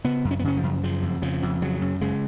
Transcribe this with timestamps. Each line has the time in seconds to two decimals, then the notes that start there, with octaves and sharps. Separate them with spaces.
0.04 C#3 B3
0.25 F#2
0.31 C#4
0.39 B3
0.44 C#3 C#4
0.57 F3
0.63 F#2
0.83 C#3 F3
1.03 F2
1.22 C#3 F3
1.43 F2
1.62 C#3 F#3
1.81 F#2
2.01 C#3 G#3